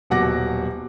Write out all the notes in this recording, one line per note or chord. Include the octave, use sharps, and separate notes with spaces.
D#1 B2 F#3 F#5 D6 A#6